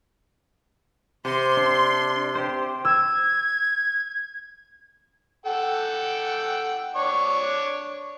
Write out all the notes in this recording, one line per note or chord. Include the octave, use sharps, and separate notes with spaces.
C3 C6
D4
G4 C5
E6 G#6
A4 F#5 G5
D4 C#5 C#6